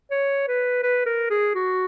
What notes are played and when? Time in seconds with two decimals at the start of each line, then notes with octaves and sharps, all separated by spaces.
0.11 C#5
0.48 B4
0.83 B4
1.06 A#4
1.30 G#4
1.55 F#4